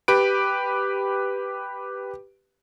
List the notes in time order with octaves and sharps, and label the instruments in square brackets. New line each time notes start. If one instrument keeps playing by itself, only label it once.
[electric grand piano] G4 B4 D7